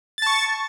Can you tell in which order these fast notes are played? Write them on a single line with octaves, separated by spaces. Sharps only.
A6 A5 C#6